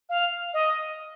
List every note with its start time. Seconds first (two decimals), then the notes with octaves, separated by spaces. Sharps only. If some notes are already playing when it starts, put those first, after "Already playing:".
0.09 F5
0.54 D#5